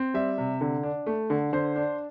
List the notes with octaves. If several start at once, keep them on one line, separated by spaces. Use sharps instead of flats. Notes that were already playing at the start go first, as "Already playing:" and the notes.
Already playing: C4
G3 E5
C3
D3
D4
A3
D3
D3 C5
D4